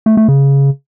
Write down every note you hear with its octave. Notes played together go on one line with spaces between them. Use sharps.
A3
A3
C#3